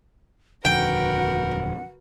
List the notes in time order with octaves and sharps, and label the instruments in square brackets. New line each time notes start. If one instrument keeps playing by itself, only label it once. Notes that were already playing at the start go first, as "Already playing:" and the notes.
[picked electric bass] D#1 F2 D3 [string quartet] F#4 A#4 B4 [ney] F#5 [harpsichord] G5